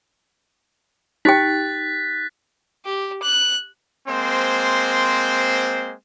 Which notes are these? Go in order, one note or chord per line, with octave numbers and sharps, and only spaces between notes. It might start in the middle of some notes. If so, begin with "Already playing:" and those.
D#4 G4 G5 F#6 A6 B6
G4
F#6
G#3 A#3 C4 C5 C6